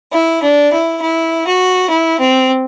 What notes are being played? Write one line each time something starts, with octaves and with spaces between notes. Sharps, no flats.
E4
D4
E4
E4
F#4
E4
C4